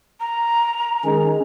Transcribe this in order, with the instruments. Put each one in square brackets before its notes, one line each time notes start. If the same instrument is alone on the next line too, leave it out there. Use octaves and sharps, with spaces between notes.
[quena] A#5
[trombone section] D#3 G#3 [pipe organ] C#4